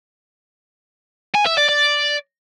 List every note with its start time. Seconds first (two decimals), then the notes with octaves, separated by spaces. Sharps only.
1.35 G#5
1.46 E5
1.58 D5
1.69 D5